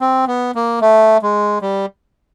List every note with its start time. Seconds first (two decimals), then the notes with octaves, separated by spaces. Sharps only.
0.01 C4
0.27 B3
0.55 A#3
0.81 A3
1.22 G#3
1.62 G3